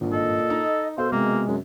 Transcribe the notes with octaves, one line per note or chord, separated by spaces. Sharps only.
G#1 G2 A#2
A4 D#5
D#4
B2 A4 C5 F5
C3 G#3 A#3
F#2